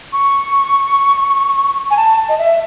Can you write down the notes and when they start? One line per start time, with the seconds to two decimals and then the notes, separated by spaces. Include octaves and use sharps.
0.13 C#6
1.91 G#5
1.97 A5
2.29 D#5
2.39 E5